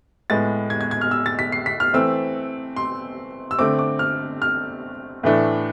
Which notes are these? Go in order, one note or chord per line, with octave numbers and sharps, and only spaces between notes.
A2 G#3 B3 A6
G#6
G#6
G#6
F6
E6
A6
B6
C7
B6
F6
E3 A3 C4 E6
C6
E6
D3 A3 C4 D6
D6
F6
F6
A2 E3 A3 D4